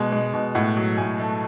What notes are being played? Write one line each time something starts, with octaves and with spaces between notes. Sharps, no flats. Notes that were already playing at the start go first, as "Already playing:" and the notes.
Already playing: B2 G#3
G#3
B2
A2 F#5
F#3
A2 G#5
A3